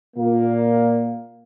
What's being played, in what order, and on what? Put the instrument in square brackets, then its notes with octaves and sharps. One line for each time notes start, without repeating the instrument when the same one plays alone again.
[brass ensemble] A#2 A#3